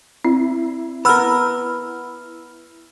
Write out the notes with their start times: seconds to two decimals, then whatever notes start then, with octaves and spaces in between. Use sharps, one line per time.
0.25 C4 E4
1.05 B3 A#4 B5 E6 F6